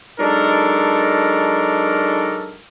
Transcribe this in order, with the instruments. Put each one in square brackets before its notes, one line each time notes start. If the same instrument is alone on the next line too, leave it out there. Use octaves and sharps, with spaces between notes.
[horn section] F#3 G#3 D4 D#4 A4 A#4